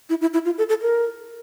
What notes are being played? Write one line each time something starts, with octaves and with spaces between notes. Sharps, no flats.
E4
E4
E4
F4
A4
A4
A#4